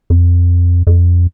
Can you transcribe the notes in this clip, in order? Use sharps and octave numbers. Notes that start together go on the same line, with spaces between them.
F2
F2